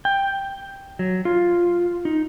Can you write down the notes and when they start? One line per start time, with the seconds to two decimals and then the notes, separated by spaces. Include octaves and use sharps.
0.05 G5
0.99 F#3
1.25 F4
2.05 D#4